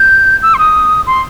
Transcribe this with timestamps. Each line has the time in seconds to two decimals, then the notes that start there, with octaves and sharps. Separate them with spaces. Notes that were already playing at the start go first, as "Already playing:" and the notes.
Already playing: G6
0.43 E6
0.54 C6
0.59 D#6
1.07 C6